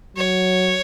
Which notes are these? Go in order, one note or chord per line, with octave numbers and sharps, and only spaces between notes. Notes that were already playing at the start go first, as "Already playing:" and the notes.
F#3 C#5